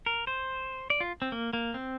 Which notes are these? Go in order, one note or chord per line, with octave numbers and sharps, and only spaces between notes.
A#4
C5
D5
F4
C4
A#3
A#3
C4